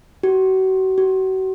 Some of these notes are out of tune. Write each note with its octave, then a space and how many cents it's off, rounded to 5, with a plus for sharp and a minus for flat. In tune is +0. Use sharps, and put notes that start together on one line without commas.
F#4 +35
F#4 +35